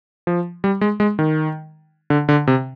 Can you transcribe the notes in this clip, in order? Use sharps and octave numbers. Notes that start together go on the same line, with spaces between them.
F3
G3
G#3
G#3
D#3
D3
D3
C3